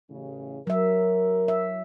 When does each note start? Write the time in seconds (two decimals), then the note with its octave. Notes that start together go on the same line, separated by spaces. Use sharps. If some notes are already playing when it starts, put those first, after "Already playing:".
0.10 A1 C#3
0.67 F#3 A#4 E5
1.48 E5